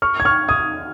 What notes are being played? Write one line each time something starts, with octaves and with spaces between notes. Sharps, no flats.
C#6 F6
G#6
C#6 F6
D#6 G#6